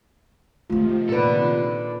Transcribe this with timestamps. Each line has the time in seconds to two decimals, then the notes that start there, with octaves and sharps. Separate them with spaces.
0.70 C3 D#3 F3 A3 B3 F4
1.09 A#2 A4 B4 D5